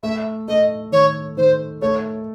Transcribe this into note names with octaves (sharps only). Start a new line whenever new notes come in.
A3 E5
A3 D#5
D#3 C#5
D#3 C5
A3 C#5